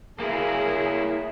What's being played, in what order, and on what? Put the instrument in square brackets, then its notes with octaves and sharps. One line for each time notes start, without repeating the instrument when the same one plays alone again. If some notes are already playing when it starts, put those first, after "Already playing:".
[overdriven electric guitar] A#3 E4 [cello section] G#4 A#4